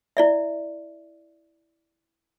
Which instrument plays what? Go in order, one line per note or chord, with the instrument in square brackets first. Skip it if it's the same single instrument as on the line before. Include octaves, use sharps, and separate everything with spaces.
[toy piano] E4 D5 E5